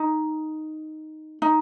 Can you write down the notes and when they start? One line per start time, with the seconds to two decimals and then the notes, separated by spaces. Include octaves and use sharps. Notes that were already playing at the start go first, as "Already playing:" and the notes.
Already playing: D#4
1.42 D#4